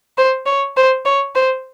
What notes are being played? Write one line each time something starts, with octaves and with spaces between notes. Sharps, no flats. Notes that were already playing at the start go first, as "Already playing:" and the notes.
C5
C#5
C5
C#5
C5